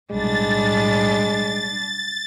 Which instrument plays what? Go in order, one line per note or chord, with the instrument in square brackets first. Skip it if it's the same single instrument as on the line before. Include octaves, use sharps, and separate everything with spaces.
[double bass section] B1 A2 [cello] G3 D4 [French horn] G#3 [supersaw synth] A6